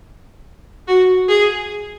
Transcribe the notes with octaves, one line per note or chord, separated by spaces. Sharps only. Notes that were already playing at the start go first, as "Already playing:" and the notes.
F#4
G#4